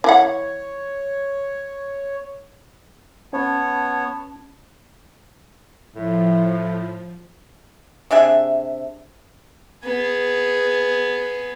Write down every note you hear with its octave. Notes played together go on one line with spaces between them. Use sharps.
E3 E4 C#5 F#5
B3 C#4 C#5 A5
A2 F3
C3 D4 G#4 E5
B3 G#4